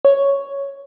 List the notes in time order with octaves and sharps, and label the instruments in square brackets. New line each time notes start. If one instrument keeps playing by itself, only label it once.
[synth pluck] C#5